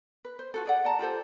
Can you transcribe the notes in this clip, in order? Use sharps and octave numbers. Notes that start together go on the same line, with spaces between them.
B4
C5
F4 F#4 A4
G#4 D5 F#5
D5 F#5 A5 A#5
F4 G4 A4 C5